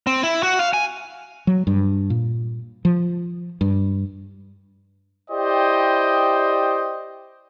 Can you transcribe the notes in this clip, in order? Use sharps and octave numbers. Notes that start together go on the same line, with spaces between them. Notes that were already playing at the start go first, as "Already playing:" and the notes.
C4
E4
F#4
F5
G#5
F#3
G2
A#2
F3
G2
E4 G4 C5 D5 D#5 G5